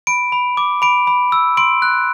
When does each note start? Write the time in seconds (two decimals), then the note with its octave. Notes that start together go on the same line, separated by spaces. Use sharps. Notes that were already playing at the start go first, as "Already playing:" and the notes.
0.07 B5 D7
0.32 B5
0.57 D6
0.82 B5 D7
1.07 B5
1.32 E6
1.57 C6 D7
1.82 F#6